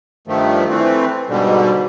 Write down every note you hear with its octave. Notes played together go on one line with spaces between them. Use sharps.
G2 D#3 F3 A3
E3 A3 C4
G#2 B2 D3 G3